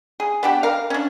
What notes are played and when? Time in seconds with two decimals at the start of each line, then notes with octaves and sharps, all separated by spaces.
0.20 G#4
0.43 B3 D4 G4
0.63 A#4 F5
0.90 C#4 D4